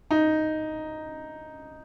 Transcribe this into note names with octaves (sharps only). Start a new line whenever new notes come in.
D#4